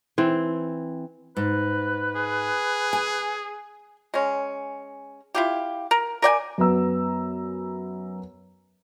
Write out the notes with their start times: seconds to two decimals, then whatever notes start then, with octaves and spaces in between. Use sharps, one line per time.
0.18 E3 C4
1.37 G#2 B4
2.16 G#4
2.93 G#5
4.14 G#3 C#4
5.35 E4 F4 G4
5.91 A#4
6.22 A#4 D5 G5 G#5
6.58 F#2 B3 A#5 E6